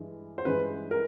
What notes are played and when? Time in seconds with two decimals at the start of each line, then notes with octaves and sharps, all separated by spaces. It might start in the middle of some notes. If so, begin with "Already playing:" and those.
Already playing: G2 E3 G#3
0.38 C5
0.45 G2 E3 G#3 C#4 B4
0.91 A#4